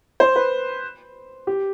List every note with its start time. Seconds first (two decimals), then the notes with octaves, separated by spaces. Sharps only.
0.20 C5
0.36 B4
1.47 G4